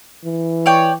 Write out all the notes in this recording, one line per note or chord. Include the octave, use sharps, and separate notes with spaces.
E3
C#5 D5 G5